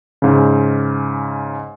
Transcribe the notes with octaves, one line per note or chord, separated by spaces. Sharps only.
G#2 C#3